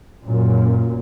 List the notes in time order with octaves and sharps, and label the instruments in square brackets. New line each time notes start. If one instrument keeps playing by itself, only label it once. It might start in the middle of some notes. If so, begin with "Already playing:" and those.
[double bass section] F#2 A#2